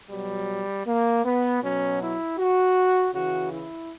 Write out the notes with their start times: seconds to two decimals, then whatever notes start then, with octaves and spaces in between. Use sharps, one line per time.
0.10 B2 F#3 G3
0.86 A#3
1.24 B3
1.62 B2 F#3 C#4
2.00 E4
2.38 F#4
3.14 C#3 E3 F#4
3.51 E4